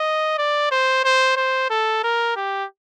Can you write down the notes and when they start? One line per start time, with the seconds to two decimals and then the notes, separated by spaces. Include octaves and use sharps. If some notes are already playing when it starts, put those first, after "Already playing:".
Already playing: D#5
0.38 D5
0.71 C5
1.04 C5
1.37 C5
1.70 A4
2.04 A#4
2.36 G4